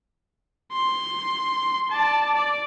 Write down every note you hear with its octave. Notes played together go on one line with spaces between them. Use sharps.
C6
D5 A5
D5